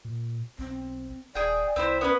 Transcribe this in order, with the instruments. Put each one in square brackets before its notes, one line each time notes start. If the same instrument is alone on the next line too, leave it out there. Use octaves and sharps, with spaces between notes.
[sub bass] A#2
[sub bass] B1 [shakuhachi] C4
[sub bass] D#1 [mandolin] G#4 G5 [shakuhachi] D5
[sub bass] C2 [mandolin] C4 E4 C5
[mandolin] B3 C#4 B4